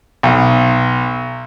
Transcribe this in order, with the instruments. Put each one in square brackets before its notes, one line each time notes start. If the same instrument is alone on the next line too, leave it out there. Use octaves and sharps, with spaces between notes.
[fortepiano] B1